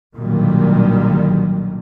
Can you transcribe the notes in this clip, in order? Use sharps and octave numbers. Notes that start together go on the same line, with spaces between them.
B1 A#2 D3 D#3 F#3 G3